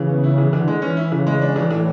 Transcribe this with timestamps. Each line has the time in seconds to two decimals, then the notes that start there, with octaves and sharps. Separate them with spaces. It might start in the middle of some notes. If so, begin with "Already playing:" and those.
Already playing: C#3 E3
0.09 B3
0.24 E4
0.38 E3
0.53 D3 E3
0.68 G#3
0.82 E3 C#4
0.97 E4
1.12 C#3 E3
1.27 G#3
1.41 D4
1.56 E3
1.70 A2 E3